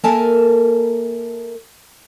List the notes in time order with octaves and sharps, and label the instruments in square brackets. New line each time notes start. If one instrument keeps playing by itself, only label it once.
[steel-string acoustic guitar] A#3 A4 A#4 E5 G#5 A5